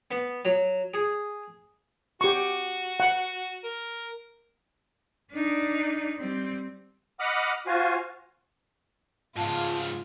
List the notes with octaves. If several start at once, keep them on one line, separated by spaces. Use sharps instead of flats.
B3
F#3
G#4
F#4 G4 C#6
F#5
A#4
D4 D#4
G3 C4
D#5 F#5 B5 D6 D#6 F6
F4 F#4 C5 F5 G#5
G#2 C#3 F4 A5